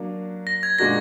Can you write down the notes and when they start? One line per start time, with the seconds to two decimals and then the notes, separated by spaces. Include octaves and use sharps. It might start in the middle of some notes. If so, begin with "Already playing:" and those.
Already playing: F#3 A#3 D4
0.47 A#6
0.63 G#6
0.78 A#2 G#3 D4 F#4 A#4 A#6